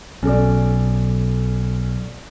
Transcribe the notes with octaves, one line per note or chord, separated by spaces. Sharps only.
B1 C#4 A4 D5